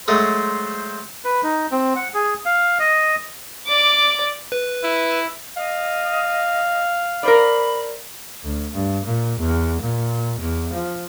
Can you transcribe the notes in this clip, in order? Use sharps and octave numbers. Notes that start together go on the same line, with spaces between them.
F#3 G#3 A3 C5
B4
D#4
C4
F#5
G#4
F5
D#5
D5 D6
B4
E4
D#5 F5
A#4 C5 D5 B5
D2
G2
A#2
E2
A#2
E2
F3